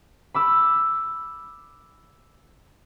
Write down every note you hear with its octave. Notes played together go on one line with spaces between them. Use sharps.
B5 D6 E6